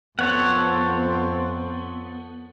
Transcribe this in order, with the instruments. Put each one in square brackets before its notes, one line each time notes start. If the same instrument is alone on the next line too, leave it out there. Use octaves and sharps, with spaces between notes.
[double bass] F2 C4 [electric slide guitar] B3 [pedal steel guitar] A4 C#5 F#5